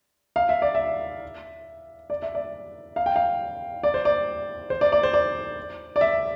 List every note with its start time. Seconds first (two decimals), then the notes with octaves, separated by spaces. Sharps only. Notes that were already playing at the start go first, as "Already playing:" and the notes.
0.36 F5
0.49 E5
0.62 D5
0.75 E5
2.10 D5
2.22 E5
2.35 D5
2.96 F5
3.06 G5
3.16 F5
3.83 D5
3.94 C5
4.05 D5
4.70 C5
4.81 D5
4.92 D5
5.03 C5
5.13 D5
5.96 D5
6.01 E5